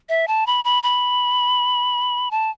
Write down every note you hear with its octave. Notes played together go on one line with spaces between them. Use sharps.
E5
A5
B5
B5
B5
A5